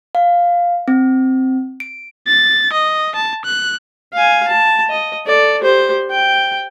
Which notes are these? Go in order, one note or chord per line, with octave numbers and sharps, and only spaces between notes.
F5
C4
D7
A6
D#5
A5
F#6
F5 G#5
A5
D#5
A4 D5
G4 C5
G5